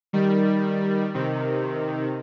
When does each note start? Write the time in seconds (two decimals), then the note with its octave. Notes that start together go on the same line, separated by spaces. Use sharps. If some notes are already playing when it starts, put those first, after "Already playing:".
0.13 D#3 G3
1.14 C3 D#3